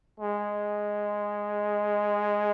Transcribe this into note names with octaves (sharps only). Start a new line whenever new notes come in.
G#3